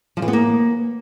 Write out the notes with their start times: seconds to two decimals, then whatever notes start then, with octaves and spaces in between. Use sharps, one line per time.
0.17 F3
0.22 E3
0.28 B3
0.33 A#3